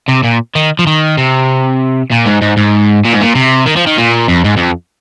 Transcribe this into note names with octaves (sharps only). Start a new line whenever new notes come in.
C3
A#2
D#3
F3
D#3
C3
A#2
G#2
G#2
G#2
A#2
G#2
A#2
C3
D#3
F3
D#3
A#2
F2
G#2
F2